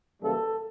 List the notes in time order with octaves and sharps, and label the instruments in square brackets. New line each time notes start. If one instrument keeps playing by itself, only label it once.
[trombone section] F#2 C#3 E3 G3 A#3 A4